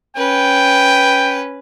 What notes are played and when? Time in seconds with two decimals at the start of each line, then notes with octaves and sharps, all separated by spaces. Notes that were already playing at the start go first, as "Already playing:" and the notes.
0.17 C#4 B4 G5